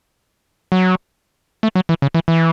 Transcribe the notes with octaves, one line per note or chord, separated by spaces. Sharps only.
F#3
A3
F#3
E3
C#3
E3
E3